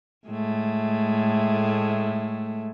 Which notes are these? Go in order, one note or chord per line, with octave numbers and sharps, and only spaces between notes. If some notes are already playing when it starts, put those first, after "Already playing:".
A2 G#3 A3